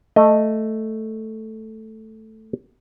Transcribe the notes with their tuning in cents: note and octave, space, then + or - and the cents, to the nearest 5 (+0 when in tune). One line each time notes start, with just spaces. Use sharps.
A3 +0 D#5 +0